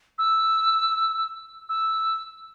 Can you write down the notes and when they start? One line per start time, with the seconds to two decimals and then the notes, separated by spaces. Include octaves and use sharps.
0.18 E6
1.69 E6